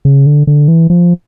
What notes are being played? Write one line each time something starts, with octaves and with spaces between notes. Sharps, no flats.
C#3
D3
D3
E3
F3